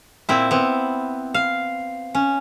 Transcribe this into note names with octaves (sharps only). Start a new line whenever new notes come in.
A#2 C4 E4
B3 C4
F5
C#4